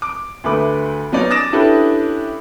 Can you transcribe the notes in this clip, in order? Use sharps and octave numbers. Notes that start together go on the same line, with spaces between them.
D6
D2 A3 B4 D6
F#3 B3 C#4 D#4 D5
D6 D#6 A6 A#6 E7
C#4 D4 E4 G4 A4 B4